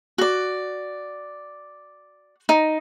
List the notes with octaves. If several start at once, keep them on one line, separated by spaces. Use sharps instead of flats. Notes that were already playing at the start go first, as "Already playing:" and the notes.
F#4 D5
D#4